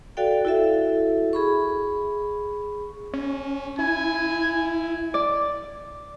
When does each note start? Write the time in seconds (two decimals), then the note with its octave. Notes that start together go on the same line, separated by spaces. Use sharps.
0.17 F#4 A4 D5 F5 G5
0.45 E4 F#4 A4 E5
1.33 G#4 B5 C#6
3.14 C#4
3.79 E4 G#5
5.14 D5